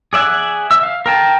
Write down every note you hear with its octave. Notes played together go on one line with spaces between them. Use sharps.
G#4 D5 E5 F#5 G#5
E5 E6
F5
A#4 G5 A5